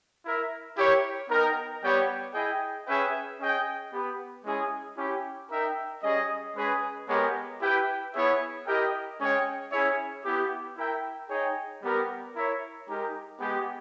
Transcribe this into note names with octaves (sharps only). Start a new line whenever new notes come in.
E4 A#4 E5
E4 G4 A#4 C#5
B3 D#4 A#4 D#5 G5
G3 B3 G4 C#5 G5
E4 G#4 D#5 G5
C#4 G#4 B4 E5 G5
C#4 G#4 D#5 G5
B3 G4 B4
G#3 C#4 E4 G#4
C#4 E4 G4
D#4 A#4 E5 G5
G3 C#4 G#4 D#5
G#3 C#4 G#4 B4
G#3 B3 G4 A#4 C#5
E4 G4 B4 G5
B3 E4 G#4 C#5 E5
E4 G4 A#4 D#5 G5
G#3 C#4 G#4 C#5 G5
C#4 E4 G#4 C#5 E5
B3 E4 G4
E4 A#4 E5 G5
D#4 G#4 C#5 G5
G3 B3 G4 A#4
E4 A#4 C#5 E5
G#3 D#4 G4 A#4
G#3 B3 G4